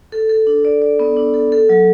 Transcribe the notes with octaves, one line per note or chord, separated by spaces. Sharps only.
A4
A4
D4
D5
D5
B3
D4
A4
A4
F#3